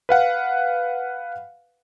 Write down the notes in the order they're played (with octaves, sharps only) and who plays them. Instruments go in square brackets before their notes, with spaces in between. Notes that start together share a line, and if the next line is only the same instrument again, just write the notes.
[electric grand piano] B4 F5 F#5